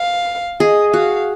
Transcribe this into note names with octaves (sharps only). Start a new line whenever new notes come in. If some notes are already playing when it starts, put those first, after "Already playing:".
Already playing: F5
G#4 D#5
F#4 F5